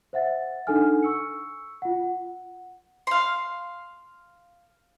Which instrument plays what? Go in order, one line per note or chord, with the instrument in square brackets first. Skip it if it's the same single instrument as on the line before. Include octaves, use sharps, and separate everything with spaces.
[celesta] C5 E5 F#5 A6
D4 D#4 A4 F#5 G#5 F6
C#6 E6 C#7
F4 F#5
F#5
[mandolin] F5 C6